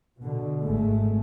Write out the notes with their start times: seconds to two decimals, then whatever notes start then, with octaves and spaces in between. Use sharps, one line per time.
0.19 B2 D3
0.63 G#1 G#3 A3